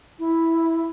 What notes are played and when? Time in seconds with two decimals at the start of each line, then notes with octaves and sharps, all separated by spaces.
0.19 E4